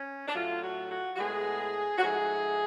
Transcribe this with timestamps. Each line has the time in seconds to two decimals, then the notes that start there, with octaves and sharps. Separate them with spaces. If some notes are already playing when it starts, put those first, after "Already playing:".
Already playing: C#4
0.28 D4
0.34 A2 F#3 A3 F4
0.62 F#4
0.90 F#4
1.15 F#4
1.19 A2 G#3 B3 G#4
1.98 F#4
2.02 G#2 F3 A3 G#4